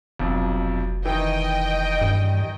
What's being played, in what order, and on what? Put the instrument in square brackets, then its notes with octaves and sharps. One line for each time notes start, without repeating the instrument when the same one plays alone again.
[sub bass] F1 [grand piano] B1 F2
[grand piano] D#3 E3 [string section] D#5 G5
[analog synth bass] G2